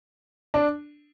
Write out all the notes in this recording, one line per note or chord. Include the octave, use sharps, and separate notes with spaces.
D4